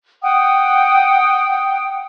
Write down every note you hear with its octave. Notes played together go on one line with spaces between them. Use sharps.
F#5 G5 D#6